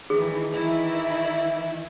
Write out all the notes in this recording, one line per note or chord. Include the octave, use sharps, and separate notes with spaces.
D#3 E3 G#4
D#3 E3 E4